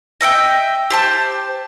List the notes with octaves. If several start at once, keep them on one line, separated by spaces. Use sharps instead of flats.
D#5 E5 F#5 G5
G4 C5 A5